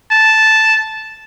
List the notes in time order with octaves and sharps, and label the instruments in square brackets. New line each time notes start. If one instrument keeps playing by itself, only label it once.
[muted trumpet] A5